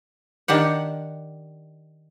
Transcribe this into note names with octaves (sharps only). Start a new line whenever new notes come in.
D#3 D4 G4 F#5